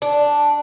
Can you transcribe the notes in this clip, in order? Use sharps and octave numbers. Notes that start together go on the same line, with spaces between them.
D4